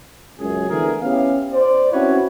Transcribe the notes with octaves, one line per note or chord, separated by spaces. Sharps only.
C#2 F#2 G#4
D3 E3 A3 B3 G#4 A#4
B3 C#4 E4 G4 F5
C5 D5
C4 C#4 E4 F#4 B4 C#5